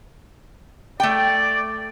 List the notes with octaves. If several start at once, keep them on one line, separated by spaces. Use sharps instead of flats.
A3 D5 G5